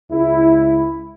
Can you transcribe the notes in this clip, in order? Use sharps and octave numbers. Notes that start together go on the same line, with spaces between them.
C#2 E4